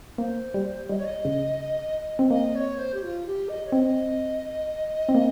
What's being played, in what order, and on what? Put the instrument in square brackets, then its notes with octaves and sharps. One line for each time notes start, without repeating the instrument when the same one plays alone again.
[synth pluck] A#3 [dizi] C5
[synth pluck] G3
[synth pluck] G3 [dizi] D#5
[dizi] C#5
D#5
[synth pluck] C#3
C4
[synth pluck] A#3 [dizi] D#5
[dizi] C#5
C5
G4
F4
G4
D#5
C#5
[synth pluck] C4 [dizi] D#5
[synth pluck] C4
A#3